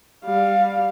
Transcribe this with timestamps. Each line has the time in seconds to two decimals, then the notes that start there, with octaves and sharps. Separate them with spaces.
0.25 G3 F5